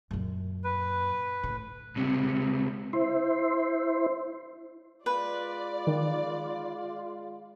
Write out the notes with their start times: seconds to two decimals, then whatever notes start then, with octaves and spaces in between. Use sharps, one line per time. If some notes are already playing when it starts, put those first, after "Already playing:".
0.11 F#2 A#2
0.64 B4
1.43 A2
1.96 C#2 C3
2.93 E4 C5
5.06 G#3 F4 B4 D5
5.87 D#3